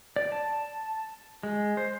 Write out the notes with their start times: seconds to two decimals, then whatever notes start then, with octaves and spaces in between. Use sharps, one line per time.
0.16 D5
0.32 A5
1.43 G#3
1.77 C5